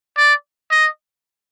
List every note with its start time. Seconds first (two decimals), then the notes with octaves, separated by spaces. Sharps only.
0.17 D5
0.71 D#5